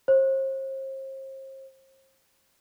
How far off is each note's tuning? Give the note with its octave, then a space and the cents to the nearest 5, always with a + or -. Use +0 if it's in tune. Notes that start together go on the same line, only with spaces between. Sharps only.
C5 +40